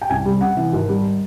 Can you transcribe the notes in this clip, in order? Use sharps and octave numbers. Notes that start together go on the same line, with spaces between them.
G5
C2 G#5
G3
C3 F#5
E3
G#1
G3